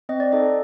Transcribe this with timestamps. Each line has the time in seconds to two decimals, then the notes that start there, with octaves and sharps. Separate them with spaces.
0.09 C4 D#5
0.20 D5
0.32 D#4 A4 D#5